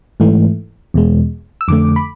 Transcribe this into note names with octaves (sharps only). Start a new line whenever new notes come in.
G#2 E3 A3
E2 B2 G#3
E6
F2 D3 A3 D6
B5